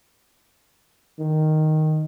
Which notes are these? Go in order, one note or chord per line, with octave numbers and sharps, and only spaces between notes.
D#3